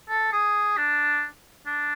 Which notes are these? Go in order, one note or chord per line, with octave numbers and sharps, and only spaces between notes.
A4
G#4
D4
D4